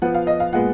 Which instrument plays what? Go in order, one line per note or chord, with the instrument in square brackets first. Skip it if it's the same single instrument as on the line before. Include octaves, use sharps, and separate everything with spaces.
[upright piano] F3 B3 F#5
F5
D#5
F5
A#2 G#3 B3 F#5